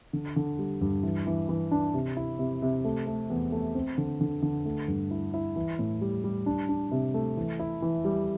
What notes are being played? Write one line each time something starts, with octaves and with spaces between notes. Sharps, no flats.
D3
D3
G3
G2
E3
E3
E3
D4
C3
E4
C3
C3
A3
A3
E2
A3
C4
D3
D3
D3
A3
G2
E4
E4
E3
A2
G3
G3
D4
D4
C3
A3
E3
E4
E3
G3